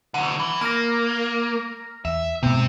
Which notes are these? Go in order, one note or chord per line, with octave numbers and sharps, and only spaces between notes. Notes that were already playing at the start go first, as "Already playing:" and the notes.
D3 F#3 F#5
E3
A#3 A#5 F6 A#6
E2 E5
G#2 B2 C4 G4